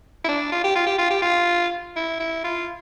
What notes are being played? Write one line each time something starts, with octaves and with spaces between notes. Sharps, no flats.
E4
D4
F4
G4
F4
G4
F4
G4
F4
E4
E4
F4